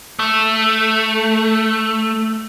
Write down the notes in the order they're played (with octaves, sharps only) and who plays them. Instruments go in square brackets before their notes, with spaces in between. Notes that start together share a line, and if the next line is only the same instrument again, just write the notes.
[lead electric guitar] A3